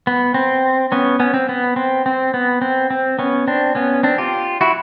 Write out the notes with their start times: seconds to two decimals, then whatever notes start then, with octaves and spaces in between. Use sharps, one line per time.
0.07 B3
0.34 C4
0.92 B3 C#4
1.20 B3 C#4
1.34 C4
1.49 B3
1.76 C4
2.06 C4
2.34 B3
2.62 C4
2.91 C4
3.19 B3 C#4
3.48 C4 D4
3.75 B3 C#4
4.03 C4 D4
4.18 F4 G4
4.61 E4 F#4